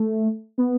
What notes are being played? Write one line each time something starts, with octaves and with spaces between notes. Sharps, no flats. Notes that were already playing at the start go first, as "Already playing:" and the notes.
Already playing: A3
B3